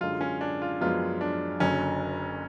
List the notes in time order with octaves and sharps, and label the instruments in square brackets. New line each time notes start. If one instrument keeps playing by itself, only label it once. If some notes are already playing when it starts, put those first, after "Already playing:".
[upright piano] F#2 D3 G#3 [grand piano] F4
[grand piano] C#4
D4
F4
[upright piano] F#2 F3 G#3 B3 [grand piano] F4
[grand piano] D4
[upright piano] F#1 F#2 D3 [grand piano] C#4